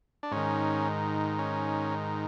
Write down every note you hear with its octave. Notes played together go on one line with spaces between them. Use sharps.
D4
G#2 D#3 C#4
C#4